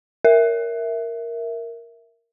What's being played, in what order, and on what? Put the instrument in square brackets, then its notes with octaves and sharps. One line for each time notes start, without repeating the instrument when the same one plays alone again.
[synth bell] A#4 E5